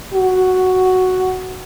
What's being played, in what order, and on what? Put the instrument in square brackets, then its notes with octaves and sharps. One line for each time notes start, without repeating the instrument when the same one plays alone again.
[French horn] F#4